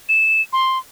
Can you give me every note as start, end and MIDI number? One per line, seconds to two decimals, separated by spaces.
0.09 0.42 100
0.53 0.78 84